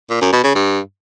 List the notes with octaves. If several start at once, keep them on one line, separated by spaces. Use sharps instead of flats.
A#2
F#2
B2
C#3
G2